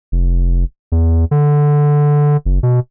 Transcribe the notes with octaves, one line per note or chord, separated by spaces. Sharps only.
F1
E2
D3
F#1
B2